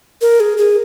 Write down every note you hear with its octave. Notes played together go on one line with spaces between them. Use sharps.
A#4
G#4
G#4